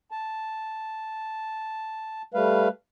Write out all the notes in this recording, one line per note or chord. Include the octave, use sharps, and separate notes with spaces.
A5
G3 A3 B4 F5